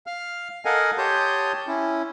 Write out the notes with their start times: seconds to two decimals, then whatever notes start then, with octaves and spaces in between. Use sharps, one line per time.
0.07 F5 F6
0.65 A4 A#4 D#5 F5 F#5 G#5
0.98 G4 C#5 A5 C6 D#6 G6
1.67 C#4 E4